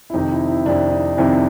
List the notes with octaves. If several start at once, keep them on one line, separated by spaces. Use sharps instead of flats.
E4
F2 C3 D#3 D#4
E4
E4
F2 C3 D#3 D4
D#4
F2 C3 D#3 E4